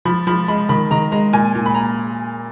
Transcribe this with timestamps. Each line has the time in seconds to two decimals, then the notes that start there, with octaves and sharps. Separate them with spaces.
0.05 F3 B5
0.27 F3 B5
0.48 G#3 B5
0.69 D#3 B5
0.91 D#3 A#5
1.12 G#3 A#5
1.33 A#2 G#5
1.55 A#2
1.66 B5
1.74 A#5